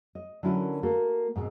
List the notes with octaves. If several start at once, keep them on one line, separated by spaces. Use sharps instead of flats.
D#5
D3 F#3 C#4 E4 F#4 A#4
A#3 F#4 A4
G#2 B2 C4